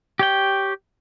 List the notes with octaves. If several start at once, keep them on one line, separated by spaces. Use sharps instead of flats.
G4 C#5 G5